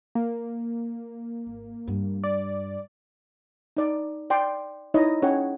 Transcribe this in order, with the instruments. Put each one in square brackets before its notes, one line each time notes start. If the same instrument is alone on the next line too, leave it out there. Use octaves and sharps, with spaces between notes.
[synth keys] A#3
[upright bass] G#1
G2
[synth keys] D5
[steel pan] D#4 D5
D5 G5 C6
D#4 E4 C#5 D#5
C#4 G#4 C#5 F#5 G5